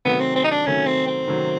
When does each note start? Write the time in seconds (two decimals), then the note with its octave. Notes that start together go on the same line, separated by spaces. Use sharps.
0.05 C3 D#3 F#3 A3 B3
0.21 C4
0.36 C4
0.44 D#4
0.51 D4
0.66 C3 D#3 F#3 A3 C#4
0.86 C4
1.07 C4
1.27 C3 D#3 F#3 A3